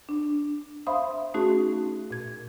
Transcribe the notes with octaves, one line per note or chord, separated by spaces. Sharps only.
D4
C5 E5 F5 B5 C6 D#6
A3 C#4 D#4 F#4 G#4
A#2 G#6